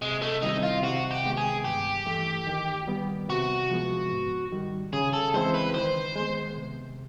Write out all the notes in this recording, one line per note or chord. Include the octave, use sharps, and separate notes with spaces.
C3 G#3
A3
D#3 G3 C4 D#4 E4
F4
C3 F#4
G4
D#3 G#3 B3
G#4
G2 G4
E3 A3
D#3
G3 B3
C3 F#4
F3 G#3 B3
G#2
D#3 G3
C#3 G#4
A4
E3 G#3 C4 E4 C5
B4
D#3 C5
G#3 B3
C3